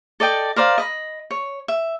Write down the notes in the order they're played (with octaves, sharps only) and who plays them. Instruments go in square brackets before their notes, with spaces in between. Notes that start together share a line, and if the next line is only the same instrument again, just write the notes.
[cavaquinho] A4 D5 D#5 G5
A#4 C5 D5 F5
D#5 B5
C#5
E5